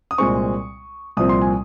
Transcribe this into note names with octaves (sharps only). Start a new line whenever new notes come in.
D#6
C2 A#2 G#3 C4 C#6
C2 A#2 F3 C4 D#6
C6
G#5